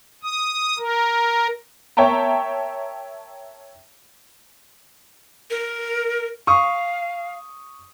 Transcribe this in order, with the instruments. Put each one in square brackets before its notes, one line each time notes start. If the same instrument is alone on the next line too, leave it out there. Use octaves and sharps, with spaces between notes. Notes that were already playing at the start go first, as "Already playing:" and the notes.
[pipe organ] D#6
A#4
[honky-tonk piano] A#4 C#5 E5 G5 A5 A#5
[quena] A#4
[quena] F5 [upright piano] C#6 D#6